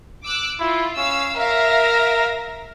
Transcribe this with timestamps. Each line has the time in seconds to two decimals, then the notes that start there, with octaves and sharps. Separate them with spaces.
0.24 D6 E6 F#6
0.60 E4 F4
0.97 C#4 F5 E6
1.36 A#4 E5 F5 A#6